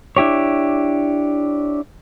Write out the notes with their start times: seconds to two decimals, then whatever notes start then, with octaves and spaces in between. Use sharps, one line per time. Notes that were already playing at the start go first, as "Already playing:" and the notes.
0.16 D4 E4 G4 C#5